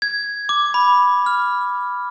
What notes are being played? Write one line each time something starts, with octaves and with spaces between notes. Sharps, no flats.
G#6
D6
B5
F6